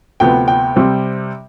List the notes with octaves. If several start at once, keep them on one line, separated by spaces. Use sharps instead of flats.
D2 C3 F3 B3 G5
G5
C3 G3 C4